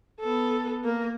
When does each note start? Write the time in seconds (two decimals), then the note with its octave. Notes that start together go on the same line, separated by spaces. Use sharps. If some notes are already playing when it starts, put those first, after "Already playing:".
0.20 B3 A4
0.84 A#3 A#4